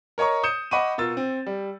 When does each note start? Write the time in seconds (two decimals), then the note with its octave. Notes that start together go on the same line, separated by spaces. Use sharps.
0.18 A#4 C#5 D#5 A#5 C#6
0.43 D#6 G6 C#7 E7
0.71 D#5 F#5 B5 C#6 D6 D#7
0.98 B2 F4 A#4 E6 A6
1.17 C4
1.46 G3